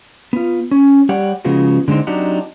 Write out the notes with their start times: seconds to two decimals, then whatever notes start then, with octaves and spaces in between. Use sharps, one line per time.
0.33 B3 F4
0.71 C#4
1.09 G3 G4 C#5 D5 F#5
1.45 C#3 F3 G#3 B3 F4 F#4
1.88 D3 G#3 B3 C4 D#4
2.07 F#3 C4 D4 D#4 G4 F#5